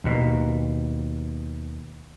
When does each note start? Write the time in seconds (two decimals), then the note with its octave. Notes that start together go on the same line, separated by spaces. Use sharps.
0.04 D#2 B2